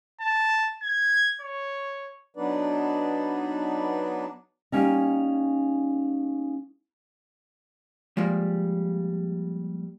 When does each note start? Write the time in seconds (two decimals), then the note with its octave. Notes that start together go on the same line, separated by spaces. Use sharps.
0.21 A5
0.83 G#6
1.41 C#5
2.37 F#3 B3 D4 D#4 B4 D5
4.72 G3 A#3 C#4 D#4
8.17 F3 G3 G#3 A#3